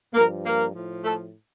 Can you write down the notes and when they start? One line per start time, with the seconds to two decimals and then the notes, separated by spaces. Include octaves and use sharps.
0.14 G2 F3 A#3 A#4
0.45 A#3 A#4
0.74 A2 F3
1.04 A3 A4